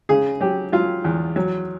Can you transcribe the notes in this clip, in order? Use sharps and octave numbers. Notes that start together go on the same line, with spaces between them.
C#3 G#4
F#3 G4
F#3 F4
E2
F#3